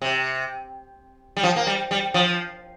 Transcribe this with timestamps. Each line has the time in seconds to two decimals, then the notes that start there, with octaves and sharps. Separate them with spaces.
0.02 C3
1.37 G3
1.43 F3
1.56 A#3
1.67 G3
1.91 G3
2.14 F3